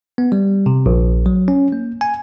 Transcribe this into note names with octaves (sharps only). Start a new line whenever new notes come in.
B3
G3
C3
A#1
F#3
C#4
A#3
G#5